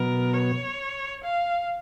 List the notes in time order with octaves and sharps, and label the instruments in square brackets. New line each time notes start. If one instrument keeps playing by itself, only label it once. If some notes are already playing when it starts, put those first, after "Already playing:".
Already playing: [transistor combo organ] B2 F#3 B3 [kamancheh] A#4
[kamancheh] C#5
F5